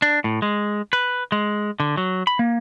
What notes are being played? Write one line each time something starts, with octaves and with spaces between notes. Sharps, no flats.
D4
A2
G#3
B4
G#3
D3
F#3
B5
A#3